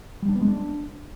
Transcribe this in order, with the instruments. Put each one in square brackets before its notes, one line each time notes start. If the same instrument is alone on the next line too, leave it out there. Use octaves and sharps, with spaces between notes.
[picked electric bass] G3
D4
B3
G#3
D4